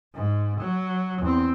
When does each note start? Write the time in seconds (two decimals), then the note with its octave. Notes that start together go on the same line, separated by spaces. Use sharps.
0.14 G#2
0.60 F#3
1.22 E2 C4